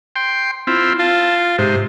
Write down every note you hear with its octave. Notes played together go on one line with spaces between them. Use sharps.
G5 C6
C4 E4 F4
F4 A5
G#2 C3 C5